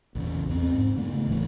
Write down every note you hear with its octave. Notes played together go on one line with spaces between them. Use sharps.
A#1 E2 C#3
E2 C4
G#2
C#3 A3 B3
D1 A2 E3 D4